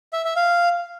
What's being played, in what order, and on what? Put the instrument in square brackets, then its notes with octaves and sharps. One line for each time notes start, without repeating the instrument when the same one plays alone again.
[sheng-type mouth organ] E5
E5
F5